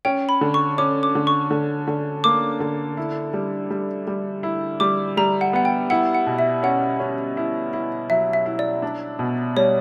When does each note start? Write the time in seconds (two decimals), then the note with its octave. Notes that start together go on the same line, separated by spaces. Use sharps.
0.05 C#4 G5
0.29 B5
0.41 D3
0.54 C#6
0.78 C#4 D6
1.03 D6
1.15 D3
1.27 C#6
1.51 D3
1.88 D3
2.24 A#3 D6
2.60 D3
2.97 E4
3.33 G3
3.70 G3
4.07 G3
4.43 E4
4.80 G3 D6
5.17 G3 A#5
5.41 F#5
5.53 B3 F#5
5.65 G5
5.90 E4 F#5
6.15 F#5
6.27 B2
6.39 E5
6.63 C#4 F#5
6.99 C#4
7.37 E4
7.73 E4
8.10 F#3 E5
8.33 E5
8.46 E4
8.59 D5
8.82 D4
9.19 B2
9.56 G3 C#5